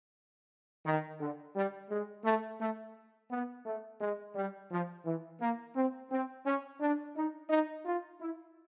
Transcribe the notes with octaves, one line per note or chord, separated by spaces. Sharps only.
D#3
D3
G3
G#3
A3
A3
B3
A3
G#3
G3
F3
E3
A#3
C4
C4
C#4
D4
D#4
D#4
F4
E4